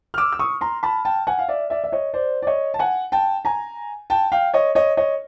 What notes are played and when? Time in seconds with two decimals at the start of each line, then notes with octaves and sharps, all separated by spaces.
0.14 F6
0.18 D6 E6
0.32 E6
0.39 C#6 D#6
0.61 A#5 C6
0.83 A5 B5
1.05 G5 A5
1.27 F#5 G#5
1.39 F5
1.48 D5 E5
1.70 D5 E5
1.84 E5
1.92 C#5 D#5
2.14 C5 D5
2.42 D5
2.47 C#5 D#5
2.74 A5
2.79 F#5 G#5
3.12 G5 A5
3.45 G#5 A#5
4.10 G5 A5
4.32 F5 G5
4.54 C#5 D#5
4.75 C#5 D#5
4.97 C#5 D#5